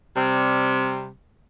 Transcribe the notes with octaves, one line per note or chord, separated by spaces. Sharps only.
C3 G3